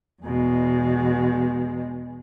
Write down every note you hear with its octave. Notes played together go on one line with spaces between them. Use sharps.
E2 B2 G#3